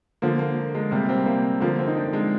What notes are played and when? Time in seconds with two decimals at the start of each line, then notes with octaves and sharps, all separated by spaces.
0.22 D3 F3 A#3
0.39 A#3
0.75 G#3
0.91 C3 G3 A#3
1.09 C4
1.26 A#3
1.60 D3 F3 A#3
1.79 C4
1.87 D#4
1.96 D4
2.13 G#3